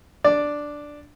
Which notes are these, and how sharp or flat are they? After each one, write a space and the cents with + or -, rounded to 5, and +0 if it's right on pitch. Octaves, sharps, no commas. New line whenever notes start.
D4 +0 D5 +0